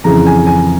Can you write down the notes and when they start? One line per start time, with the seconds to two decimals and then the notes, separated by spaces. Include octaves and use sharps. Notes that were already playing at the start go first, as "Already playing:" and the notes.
0.04 F2 C#3 E3 A#5
0.27 G#5
0.47 G#5